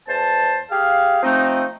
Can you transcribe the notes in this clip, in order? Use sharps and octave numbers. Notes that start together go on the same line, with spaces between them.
E2 C5 A5
G4 G#4 F5
F3 A3 C4 D#4